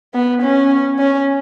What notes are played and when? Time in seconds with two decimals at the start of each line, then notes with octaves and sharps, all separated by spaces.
0.14 B3
0.42 C#4
0.99 C#4